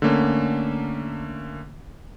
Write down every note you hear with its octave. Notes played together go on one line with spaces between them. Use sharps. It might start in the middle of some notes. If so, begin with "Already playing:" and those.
D3 A3 A#3 C#4